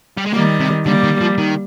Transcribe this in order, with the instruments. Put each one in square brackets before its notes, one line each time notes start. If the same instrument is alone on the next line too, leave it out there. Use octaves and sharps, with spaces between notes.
[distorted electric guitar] G3
G#3
[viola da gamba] D#3 G3 [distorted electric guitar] A#3
[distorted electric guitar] C3
[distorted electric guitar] D3 [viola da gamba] G3 A#3
[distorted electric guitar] D#3
F3
D#3